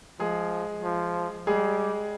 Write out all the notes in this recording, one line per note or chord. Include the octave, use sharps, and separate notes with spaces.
F3 G#3 G#4
F3
G3 G#3 G#4